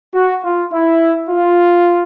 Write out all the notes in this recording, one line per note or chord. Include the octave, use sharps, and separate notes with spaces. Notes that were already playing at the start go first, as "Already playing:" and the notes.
F#4
F4
E4
F4